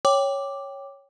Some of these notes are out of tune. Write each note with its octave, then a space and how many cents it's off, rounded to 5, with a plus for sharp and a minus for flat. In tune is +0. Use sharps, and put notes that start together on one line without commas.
C#5 +0 G5 +0 D6 +0